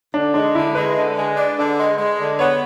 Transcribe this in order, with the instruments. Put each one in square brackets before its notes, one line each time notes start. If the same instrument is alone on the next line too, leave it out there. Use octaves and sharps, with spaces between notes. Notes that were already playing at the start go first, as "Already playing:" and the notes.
[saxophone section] D3 [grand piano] D4
[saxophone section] G#3 [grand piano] D4
[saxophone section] D3 [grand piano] E4
[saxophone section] G#3 [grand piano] B4
[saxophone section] D3
G#3
D4
D3
G#3
G#3
D3
[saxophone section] B3 [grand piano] C#5